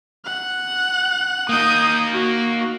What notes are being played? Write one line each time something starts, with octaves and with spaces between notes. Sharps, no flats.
F#5
A#3 D#4 D#6 G6
F#4